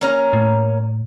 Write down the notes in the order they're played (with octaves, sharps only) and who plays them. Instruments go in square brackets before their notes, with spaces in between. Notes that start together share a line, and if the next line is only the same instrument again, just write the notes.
[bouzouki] A#3 C#4 A#5
[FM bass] A2